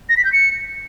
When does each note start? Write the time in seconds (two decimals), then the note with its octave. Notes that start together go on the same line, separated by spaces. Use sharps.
0.09 A#6
0.17 B6
0.25 G6
0.33 C#7